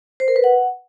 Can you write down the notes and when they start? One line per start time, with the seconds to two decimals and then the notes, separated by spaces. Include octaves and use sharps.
0.20 C5
0.28 A#4
0.36 B4
0.44 F#5